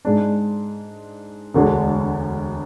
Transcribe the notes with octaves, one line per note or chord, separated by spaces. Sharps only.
G#2 G#3 D4
E1 D2 D3 G#3